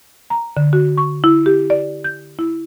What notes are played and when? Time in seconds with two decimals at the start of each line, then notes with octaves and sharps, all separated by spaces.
0.30 A#5
0.57 D3
0.73 F#4
0.97 C#6
1.24 E4
1.46 G4
1.70 D5
2.04 G6
2.39 E4